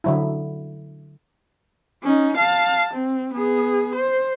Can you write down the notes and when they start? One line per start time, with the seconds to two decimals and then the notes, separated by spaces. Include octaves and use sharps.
0.04 D3 F#3 E4
2.03 C#4 D#4
2.37 F5 A5
2.94 C4
3.34 B3 G#4
3.95 C5